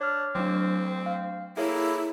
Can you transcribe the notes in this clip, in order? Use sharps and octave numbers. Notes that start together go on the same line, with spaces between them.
D4 C#5 F6
F#3 A3 C4 D4 D6
F5
A#3 E4 G#4 A4 C#5 E5 A#5